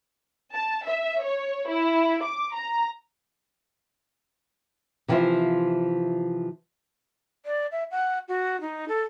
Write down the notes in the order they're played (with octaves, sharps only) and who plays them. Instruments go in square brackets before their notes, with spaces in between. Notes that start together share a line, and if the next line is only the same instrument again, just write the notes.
[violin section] A5
E5
C#5
E4
D6
A#5
[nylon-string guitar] C3 E3 F3 F4 C5 E5
[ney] D5
E5
F#5
F#4
D#4
A4